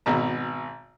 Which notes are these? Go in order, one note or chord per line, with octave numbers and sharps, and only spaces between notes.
G#1 B2 A#5